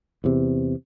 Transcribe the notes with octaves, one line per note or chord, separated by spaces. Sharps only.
E2 C3